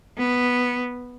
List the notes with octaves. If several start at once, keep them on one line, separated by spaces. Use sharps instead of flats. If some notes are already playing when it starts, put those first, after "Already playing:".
B3